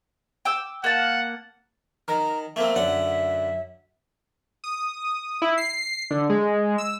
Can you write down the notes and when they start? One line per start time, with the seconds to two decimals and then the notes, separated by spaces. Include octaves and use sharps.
0.45 G5 D6 E6
0.84 A#3 F#5 A5
2.08 D#3 A#5
2.56 A3 A#3 C4 E5
2.75 F#2 D3 F#5
4.64 D#6
5.42 E4
5.58 C7
6.11 D3
6.30 G#3
6.78 E6